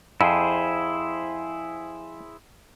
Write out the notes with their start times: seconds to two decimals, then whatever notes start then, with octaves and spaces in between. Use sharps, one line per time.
0.21 F2 E4 G#4 C5